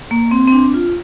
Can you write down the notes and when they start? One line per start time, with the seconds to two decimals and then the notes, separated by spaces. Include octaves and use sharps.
0.11 A#3
0.31 C4
0.47 C4
0.52 D4
0.74 F4